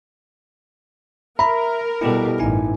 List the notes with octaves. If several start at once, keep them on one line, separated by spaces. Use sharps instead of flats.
A#4 E5 A#5 B5
B2 G3 E4 G4 A4
A1 G2 D#4 E4 G#5